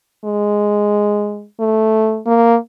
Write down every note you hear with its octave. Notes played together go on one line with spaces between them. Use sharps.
G#3
A3
A#3